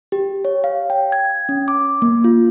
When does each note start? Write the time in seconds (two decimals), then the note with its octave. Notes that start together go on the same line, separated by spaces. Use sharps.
0.12 G4
0.45 C#5
0.64 F5
0.90 G5
1.12 G#6
1.49 C#4
1.68 D6
2.02 A#3
2.24 F4